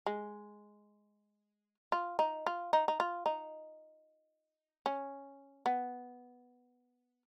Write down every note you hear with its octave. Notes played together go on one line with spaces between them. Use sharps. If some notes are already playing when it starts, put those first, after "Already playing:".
G#3
F4
D#4
F4
D#4
D#4
F4
D#4
C#4
B3